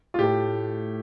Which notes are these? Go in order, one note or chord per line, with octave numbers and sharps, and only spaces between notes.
F4
A2 A3 G4